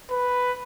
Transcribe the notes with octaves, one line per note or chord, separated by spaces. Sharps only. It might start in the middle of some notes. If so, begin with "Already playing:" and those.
B4